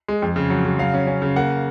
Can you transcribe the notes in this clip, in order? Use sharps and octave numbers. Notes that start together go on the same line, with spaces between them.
G#3
F2
C#3
F#3
C#3
F#3 F5
C#4
C#4
C#3
A#3 F#5